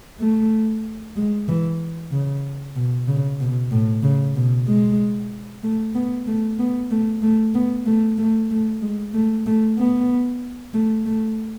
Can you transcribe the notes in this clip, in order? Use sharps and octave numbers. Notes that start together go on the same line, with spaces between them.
A3
G#3
E3
C#3
B2
C#3
B2
A2
C#3
B2
G#3
A3
B3
A3
B3
A3
A3
B3
A3
A3
A3
G#3
A3
A3
B3
A3
A3